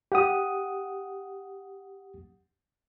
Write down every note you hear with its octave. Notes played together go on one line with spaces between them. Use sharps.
G4 F#5 D#6